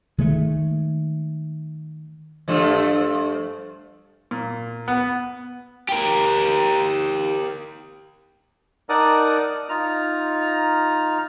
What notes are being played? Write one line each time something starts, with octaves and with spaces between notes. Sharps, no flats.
D#3 G#3 A3
G2 F3 A3
A#2
B3
G4 A#4
D#4 A#4 D5 F#5 A5 D#6
D#4 F4 A#5 F6